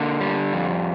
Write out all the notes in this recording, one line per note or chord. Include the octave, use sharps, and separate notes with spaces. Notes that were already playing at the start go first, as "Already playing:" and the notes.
Already playing: D3 A#3
G3
F2